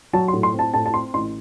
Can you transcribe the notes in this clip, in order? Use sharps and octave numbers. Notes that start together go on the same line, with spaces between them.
F#3 A5
C6
A2
C6
C4
A5
A2 A5
A5
C4 C6
A1 C6